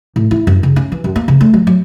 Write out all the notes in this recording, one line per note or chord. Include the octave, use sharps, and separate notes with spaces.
A2
E4
F#2
C#3
C#4
E3
F#2
A#3
C#3
A3
F#3
F#3